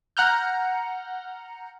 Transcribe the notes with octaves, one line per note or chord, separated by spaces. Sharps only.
F#5 A#5 F6 G6